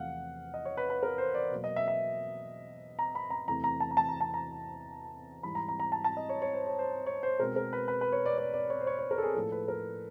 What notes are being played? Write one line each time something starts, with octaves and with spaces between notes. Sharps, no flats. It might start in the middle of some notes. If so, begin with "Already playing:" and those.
Already playing: E2 C3 F3 A3 F5 F#5
D#5
C#5
B4
B4
A#4
C5
D5
B2 F#3 A#3
D#5
E5
E5
A#5
B5
A#5
E2 C3 E3 A3 A#5
A#5
A5
A#5
A5
A#5
A5
A#5
G#2 E3 G3 B5
A#5
A#5
A#5
A5
A5
D#5
C#5
C#5
C5
C#5
C5
C#5
C5
B2 G#3 C4 A#4
A#4
B4
B4
B4
C#5
D5
D5
D5
C#5
C5
C#5
C#5
A#4
A4
G#4
A2 F3 A#3 A4
B4
A#4